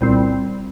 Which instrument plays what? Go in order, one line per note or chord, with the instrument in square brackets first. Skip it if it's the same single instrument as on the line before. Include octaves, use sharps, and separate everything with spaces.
[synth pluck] C2 A#2 G3 C4